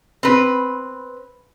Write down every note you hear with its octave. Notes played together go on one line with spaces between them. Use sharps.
C4 B4